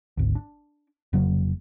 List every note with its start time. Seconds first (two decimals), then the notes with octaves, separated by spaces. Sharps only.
0.17 G#1 D2
0.35 D4
1.13 F1 C#3 F#3 A#3